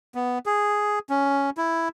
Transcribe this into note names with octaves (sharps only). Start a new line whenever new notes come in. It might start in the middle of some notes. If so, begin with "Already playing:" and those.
B3
G#4
C#4
E4